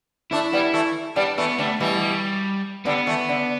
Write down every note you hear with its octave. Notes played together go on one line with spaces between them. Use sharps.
A3 D4 E4
G3 B3
E3 A3
G3 B3 D4
E3 A3 B3
D3 G3 A3
B2 E3 G3
G3
D3 G3 B3
E3 A3
D3